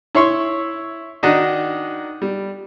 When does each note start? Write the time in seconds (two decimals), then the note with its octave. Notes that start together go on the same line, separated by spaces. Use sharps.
0.15 E4 C#5 C6 C#6 E6
1.23 D#3 D4 D#4 F#4 D#5
2.22 G3